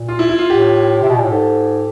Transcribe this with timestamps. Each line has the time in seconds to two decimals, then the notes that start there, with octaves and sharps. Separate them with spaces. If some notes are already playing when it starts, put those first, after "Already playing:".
Already playing: A#2
0.08 F4
0.19 E4
0.29 E4
0.39 F4
0.50 A2 G4
1.02 C3
1.09 B2
1.17 A#2
1.24 A2
1.31 G#2 A4